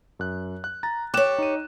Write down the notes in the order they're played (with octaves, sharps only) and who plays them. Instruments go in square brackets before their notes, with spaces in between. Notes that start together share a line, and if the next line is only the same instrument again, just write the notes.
[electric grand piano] F#2 F#6
F#6
A#5 A6
[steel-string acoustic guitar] G4 C#5 [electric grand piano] D6 F#6 E7
[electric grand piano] D#4 D#7